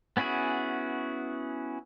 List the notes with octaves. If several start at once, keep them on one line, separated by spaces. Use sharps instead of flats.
B3 C#4 E4 F#4 G#4